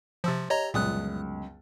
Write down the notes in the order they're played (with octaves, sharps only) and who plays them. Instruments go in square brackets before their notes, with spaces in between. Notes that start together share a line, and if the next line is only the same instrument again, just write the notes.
[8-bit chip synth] C3 F3 [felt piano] C6 E6 A6
[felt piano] G4 [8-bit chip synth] C#5 D#5 A#5
[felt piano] G1 C#2 F#2 [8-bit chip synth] A#2 D#6 F#6